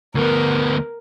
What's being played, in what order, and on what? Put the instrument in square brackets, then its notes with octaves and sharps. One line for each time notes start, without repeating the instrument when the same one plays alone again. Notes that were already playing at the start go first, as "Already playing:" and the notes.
[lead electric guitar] D2 B3 [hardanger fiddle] A#4